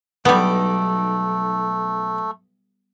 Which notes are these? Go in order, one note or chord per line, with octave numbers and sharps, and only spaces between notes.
B1 G3 A3 B3 D#4 D6